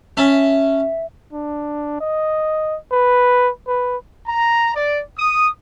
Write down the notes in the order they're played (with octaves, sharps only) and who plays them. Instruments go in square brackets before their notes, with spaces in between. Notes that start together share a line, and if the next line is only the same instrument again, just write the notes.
[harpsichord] C#4 A5 [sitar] E5
[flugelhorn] D4
D#5
B4
B4
[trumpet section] A#5
D5
D#6